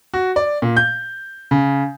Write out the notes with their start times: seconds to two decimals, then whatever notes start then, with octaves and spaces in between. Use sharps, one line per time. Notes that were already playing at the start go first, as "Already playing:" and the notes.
0.14 F#4
0.36 D5
0.62 A#2
0.77 G6
1.51 C#3